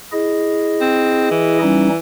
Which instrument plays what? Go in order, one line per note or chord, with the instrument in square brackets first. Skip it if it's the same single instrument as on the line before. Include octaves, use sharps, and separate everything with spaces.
[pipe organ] E4 G#4 D#5
[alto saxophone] C4
E3
[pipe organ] G3 C#4 D#4